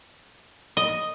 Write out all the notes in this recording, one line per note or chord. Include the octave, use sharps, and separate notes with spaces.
D#5